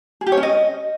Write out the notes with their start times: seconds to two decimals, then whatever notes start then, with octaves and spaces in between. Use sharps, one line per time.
0.21 G#4
0.27 G4
0.32 C#5
0.37 C#4
0.43 D#5